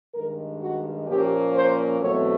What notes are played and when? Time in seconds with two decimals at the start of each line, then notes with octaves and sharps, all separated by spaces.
0.14 G2 D#3 G#3 A#4
0.60 F#4
1.07 A#2 F3 A#3 C#4 G4
1.53 C5
1.99 E2 B2 F#3 A3 C4 C#5